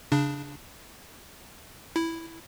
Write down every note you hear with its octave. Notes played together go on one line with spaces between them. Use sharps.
C#3 D4
E4